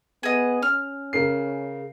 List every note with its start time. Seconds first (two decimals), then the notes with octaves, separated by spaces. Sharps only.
0.23 B3 G#4 D#5
0.62 C#4 F6
1.13 C#3 A#4 C7